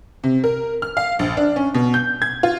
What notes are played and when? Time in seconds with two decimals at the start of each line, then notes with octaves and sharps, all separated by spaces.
0.24 C3
0.44 A#4
0.82 F6
0.97 F5
1.19 A#1
1.37 D4
1.56 C#4
1.74 B2
1.94 G6
2.22 G#6
2.43 F4